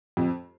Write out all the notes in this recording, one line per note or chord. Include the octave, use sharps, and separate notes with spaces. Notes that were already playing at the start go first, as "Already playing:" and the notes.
F2